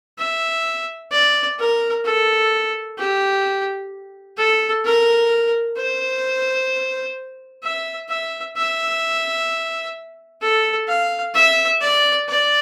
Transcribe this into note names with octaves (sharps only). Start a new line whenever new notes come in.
E5
D5
A#4
A4
G4
A4
A#4
C5
E5
E5
E5
A4
F5
E5
D5
D5